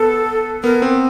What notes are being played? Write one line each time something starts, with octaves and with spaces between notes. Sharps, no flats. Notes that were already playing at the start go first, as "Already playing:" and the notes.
Already playing: B3 A4
B3 A#4
C4